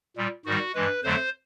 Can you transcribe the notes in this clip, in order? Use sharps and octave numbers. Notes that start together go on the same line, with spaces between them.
A#2 G3
G#2 D#3 G3 F#4
G2 E3 G#3 B4
F2 D3 F#3 A3 C5